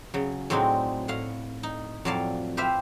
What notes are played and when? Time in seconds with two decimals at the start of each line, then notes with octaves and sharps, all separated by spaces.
0.14 C#3 F#3
0.50 A2 F#3 G#3 C4 D4 D#4
1.08 A2 F5 F#5
1.63 D#4
2.05 F2 A2 F#3 D5 F5 A5
2.57 G4 B4 C5 E5 F5